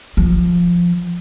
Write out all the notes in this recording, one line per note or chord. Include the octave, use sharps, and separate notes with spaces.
F3